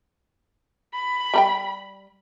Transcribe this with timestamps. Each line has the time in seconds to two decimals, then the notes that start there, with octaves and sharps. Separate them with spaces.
0.93 B5
1.34 G3 A#4 G5